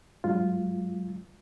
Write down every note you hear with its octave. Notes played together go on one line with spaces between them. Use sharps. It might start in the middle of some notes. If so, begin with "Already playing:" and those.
G2 F#3 G#3 F4